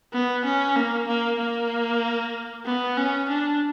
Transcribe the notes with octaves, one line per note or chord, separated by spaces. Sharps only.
B3
C#4
A#3
A#3
A#3
B3
C#4
D4